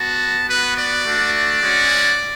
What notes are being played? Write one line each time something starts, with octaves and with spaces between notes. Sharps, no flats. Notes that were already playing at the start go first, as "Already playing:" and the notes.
Already playing: B3 F#4 A5
B3 F#4 B4
D5
A3 D4 F#4
D5
G#3 C#4 F#4